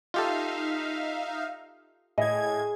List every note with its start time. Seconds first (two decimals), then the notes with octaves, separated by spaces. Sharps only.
0.14 D#4 F4 G4 A4 E5 F5
2.18 A2 G#4 D#5 G#6